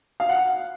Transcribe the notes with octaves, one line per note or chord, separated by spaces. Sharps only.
F5
F#5